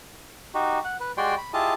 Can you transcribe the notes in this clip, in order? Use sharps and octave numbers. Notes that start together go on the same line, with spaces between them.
D#4 F#4 G4
F#5
B4
G#3 F#4 G4 D5 G5 C6
B5
E4 F4 G4 G#4 D#5 A5